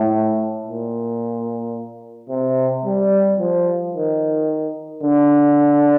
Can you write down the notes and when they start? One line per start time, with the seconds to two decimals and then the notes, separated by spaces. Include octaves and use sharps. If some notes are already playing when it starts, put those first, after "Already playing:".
Already playing: A2
0.66 A#2
2.29 C3
2.85 G3
3.39 F3
3.94 D#3
5.03 D3